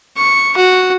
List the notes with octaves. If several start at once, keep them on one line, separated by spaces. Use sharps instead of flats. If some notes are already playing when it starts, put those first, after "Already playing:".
C#6
F#4